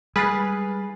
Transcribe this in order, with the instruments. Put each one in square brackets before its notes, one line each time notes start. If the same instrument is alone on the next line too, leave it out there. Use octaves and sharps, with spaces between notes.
[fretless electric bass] G3 G#3 [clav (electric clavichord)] G#4 [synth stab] B4 [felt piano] F6 A6 C7